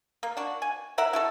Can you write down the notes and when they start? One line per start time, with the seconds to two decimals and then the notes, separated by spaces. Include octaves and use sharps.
0.23 A#3
0.37 D4 F#4
0.62 G#5
0.98 E4 A#4 E5 F#5
1.13 E4 F#4 A4